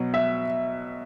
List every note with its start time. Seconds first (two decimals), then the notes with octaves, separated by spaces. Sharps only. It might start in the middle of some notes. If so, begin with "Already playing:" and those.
Already playing: B2 F#3
0.14 E5